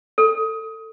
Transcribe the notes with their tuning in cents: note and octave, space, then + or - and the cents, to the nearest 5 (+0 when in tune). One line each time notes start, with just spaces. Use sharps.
A4 +20